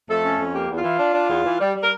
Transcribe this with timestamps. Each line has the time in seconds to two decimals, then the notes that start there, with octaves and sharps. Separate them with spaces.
0.08 F2 A3 A4
0.23 C#4
0.39 F2
0.54 A#3 G4
0.69 E2
0.76 F4
0.84 E3
0.99 D4
1.14 D4
1.29 E2
1.45 E3
1.60 G3
1.75 G3
1.82 A#4